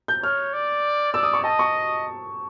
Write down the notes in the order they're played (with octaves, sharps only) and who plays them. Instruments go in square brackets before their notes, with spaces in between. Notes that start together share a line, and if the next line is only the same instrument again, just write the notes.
[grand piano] G6
[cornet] C#5 [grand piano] F6
[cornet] D5
[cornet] D5 [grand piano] E6
[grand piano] D#6
C#6
[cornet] D#5 [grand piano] A5
[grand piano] C#6